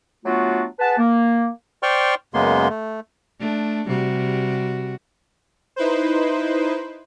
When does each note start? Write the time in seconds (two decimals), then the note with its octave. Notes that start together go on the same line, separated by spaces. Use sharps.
0.25 F#3 A3 B3 D4 F4 F#4
0.79 G#4 B4 F#5 A5
0.98 A#3
1.83 C5 D5 G5 C6 C#6 F6
2.34 F#2 C#3 G#3 A#3 B3 C6
2.70 A3
3.40 A3 D4
3.87 C3 G3 F#4
5.76 D#4 E4 B4 C5